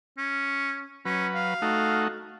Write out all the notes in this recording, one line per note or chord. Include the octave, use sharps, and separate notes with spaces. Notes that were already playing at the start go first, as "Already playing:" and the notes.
C#4
F#3 C#4 B4
F5
A3 D#4 F#4